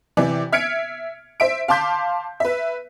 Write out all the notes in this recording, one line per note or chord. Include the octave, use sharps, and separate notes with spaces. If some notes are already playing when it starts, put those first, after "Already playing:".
C3 E3 D5
E5 F6 G#6 C#7 D7
C5 E5 D7
F5 A5 C6 D6 G6 B6
B4 E5